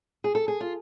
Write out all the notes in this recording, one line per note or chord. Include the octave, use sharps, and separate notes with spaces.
G#4
A4
G#4
F4